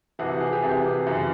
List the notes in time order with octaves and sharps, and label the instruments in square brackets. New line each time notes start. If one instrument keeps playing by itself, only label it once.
[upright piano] F2 C3 E3 F#4
G#4
G4
F2 C3 E3 G#4
F#2 C#3 E3